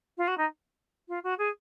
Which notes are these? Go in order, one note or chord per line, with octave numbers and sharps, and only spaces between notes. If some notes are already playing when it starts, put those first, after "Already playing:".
F4
F#4
D#4
F4
F#4
G#4